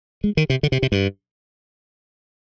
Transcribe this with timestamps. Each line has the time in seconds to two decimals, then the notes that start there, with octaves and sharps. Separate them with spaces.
0.24 G#3
0.37 D#3
0.50 C3
0.63 D3
0.72 C3
0.83 C3
0.92 G2